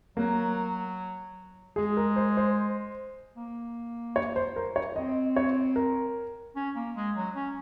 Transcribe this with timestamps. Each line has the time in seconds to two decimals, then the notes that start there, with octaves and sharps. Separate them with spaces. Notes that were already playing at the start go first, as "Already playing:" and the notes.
0.17 F#3 A#3
1.76 G#3 G#4
1.97 A#4
2.16 C5
2.37 C5
3.36 A#3
4.16 C#5
4.36 C5
4.56 A#4
4.76 C#5
4.96 C4 D#5
5.36 C#5
5.76 A#4
6.56 C#4
6.76 A#3
6.96 G#3
7.16 F#3
7.36 C#4